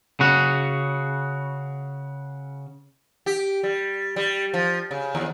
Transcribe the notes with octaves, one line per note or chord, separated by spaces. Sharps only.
C#3 F#4
G4
G3
G3
F3
C#3
D#2